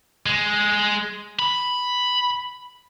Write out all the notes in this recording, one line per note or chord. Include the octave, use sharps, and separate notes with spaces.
G#3
B5